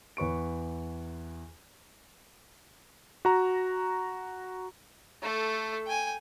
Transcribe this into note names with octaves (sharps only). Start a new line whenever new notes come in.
E2 B4 C#6 D7
F#4 A#5
A3 A4
G5 G#5